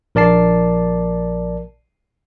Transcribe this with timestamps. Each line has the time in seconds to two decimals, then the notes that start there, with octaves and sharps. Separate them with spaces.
0.15 A#1 A#4 D5 A5 C7